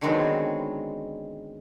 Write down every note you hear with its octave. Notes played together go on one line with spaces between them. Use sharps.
D3 D#3 F#3 G#3 B3 C4